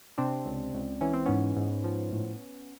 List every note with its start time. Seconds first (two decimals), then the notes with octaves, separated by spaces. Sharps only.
0.18 C3 C4 D4
0.46 C#2
0.74 C#2
1.01 E3 C#4
1.13 C4
1.26 G#2 B3 C#4
1.56 G#2
1.84 F3
2.11 A2